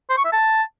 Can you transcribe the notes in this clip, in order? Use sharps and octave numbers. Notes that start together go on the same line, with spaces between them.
C5
C#6
E5
A5